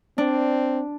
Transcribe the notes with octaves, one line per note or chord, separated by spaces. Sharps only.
C4 D4